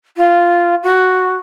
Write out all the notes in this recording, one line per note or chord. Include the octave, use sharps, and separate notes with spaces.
F4
F#4